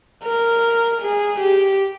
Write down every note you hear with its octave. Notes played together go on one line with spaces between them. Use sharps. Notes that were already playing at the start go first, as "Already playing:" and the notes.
A#4
G#4
G4